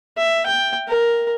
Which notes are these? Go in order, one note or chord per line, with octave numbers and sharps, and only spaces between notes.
E5
G5
A#4